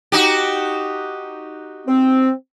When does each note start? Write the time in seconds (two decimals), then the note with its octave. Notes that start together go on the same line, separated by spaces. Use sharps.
0.12 D#4 F#4 G4
1.87 C4